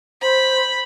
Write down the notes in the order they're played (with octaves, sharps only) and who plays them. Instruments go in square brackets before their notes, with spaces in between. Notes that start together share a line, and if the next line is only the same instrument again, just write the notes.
[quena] C5 [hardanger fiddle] B5